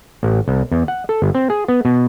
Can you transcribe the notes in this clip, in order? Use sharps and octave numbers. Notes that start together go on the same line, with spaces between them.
A1
C2
E2
F#5
A4
G1
C4
G#4
B3
B2